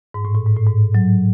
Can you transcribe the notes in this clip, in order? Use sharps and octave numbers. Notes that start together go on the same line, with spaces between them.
G#2
A2
A2
G#2
A2
G#2
F#3